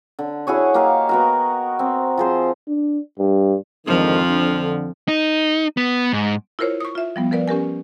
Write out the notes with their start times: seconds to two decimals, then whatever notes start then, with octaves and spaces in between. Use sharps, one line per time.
0.19 D3
0.47 E4 F#4 G#4 C#5
0.74 A#3 G4 D#5 F5
1.09 B3 F#4 A#4
1.79 C4
2.18 F3 G#4 C5
2.68 D4
3.19 G2
3.87 F2 G#2 D3 D#3 F3
4.28 D3
5.08 D#4
5.77 B3
6.13 G#2
6.59 E4 F4 A#4 C5 C#5
6.80 C#6 D#6
6.95 F4 E5
7.16 F3 G3 B3
7.31 F3 A#4 B4 D5
7.48 C#4 G4 A#4 G#5